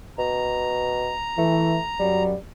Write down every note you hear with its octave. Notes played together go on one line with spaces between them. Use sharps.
B2 A#5
E3 A3
F#2 F#3 G3